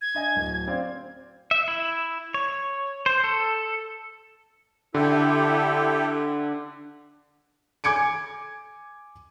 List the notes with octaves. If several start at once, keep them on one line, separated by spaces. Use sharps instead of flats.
G#6
D4 D#5 G#5
D1
C4 D5 F5
E5
E4
C#5
C5
A4
D3 E4 G4 A4
G#5 D6 G#6 C#7 D7